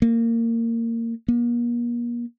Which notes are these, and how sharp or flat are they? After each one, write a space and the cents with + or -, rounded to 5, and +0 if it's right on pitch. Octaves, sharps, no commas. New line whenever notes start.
A#3 -20
A#3 +40